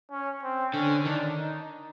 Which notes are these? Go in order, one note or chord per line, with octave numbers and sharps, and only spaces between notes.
C#4
C4
D3 C#4
D#3 D4
D#4